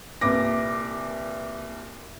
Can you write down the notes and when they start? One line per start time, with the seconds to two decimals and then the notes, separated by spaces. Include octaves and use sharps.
0.21 C2 A#2 B4 D6 A#6